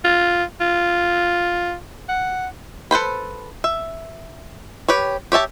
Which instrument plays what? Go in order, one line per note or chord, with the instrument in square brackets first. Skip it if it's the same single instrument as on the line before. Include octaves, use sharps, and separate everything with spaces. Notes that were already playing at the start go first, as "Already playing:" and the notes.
[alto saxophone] F4
F4
F#5
[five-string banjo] A4 B4 C5 B5
E5
G4 B4 C#5
G4 C#5 E5 A5